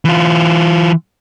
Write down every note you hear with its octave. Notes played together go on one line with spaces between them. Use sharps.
E3 F4